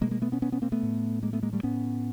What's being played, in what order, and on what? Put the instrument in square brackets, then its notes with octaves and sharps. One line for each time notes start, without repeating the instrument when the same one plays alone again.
[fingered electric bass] B2 G#3 A#3
G#3 A#3
A3 B3
B3 C#4
B3 C#4
B3 C#4
A#3 C4
A3 B3
A2
G#3 A#3
A3 B3
G#3 A#3
G3 A3
A2 B3 C#4